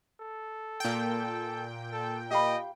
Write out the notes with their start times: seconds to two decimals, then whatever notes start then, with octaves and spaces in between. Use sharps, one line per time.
0.21 A4
0.80 A#2 G5
1.92 A4
2.31 G4 D#5 F5 B5